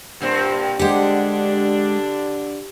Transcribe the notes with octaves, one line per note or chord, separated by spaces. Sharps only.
G2 A#2 C4
D3 G#3 D4 G4 F#5